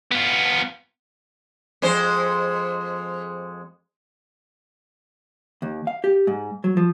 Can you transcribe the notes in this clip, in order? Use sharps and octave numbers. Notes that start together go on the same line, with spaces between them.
B3 F4
F2 G#3 C5
D#2
F5
G4
G#2
F#3
F3